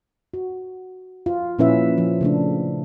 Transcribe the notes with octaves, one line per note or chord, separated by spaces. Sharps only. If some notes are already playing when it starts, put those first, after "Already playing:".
F#4
F4
A#2 F3 C#4 E4 B4 E5
F3
C#3 A3 D4